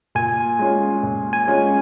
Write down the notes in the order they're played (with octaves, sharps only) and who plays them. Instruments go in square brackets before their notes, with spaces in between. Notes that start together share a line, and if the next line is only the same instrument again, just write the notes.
[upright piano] A#2 [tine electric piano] G#5
[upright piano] G#3 C#4 F4
A#2
[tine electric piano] G#5
[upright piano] G#3 C#4 F4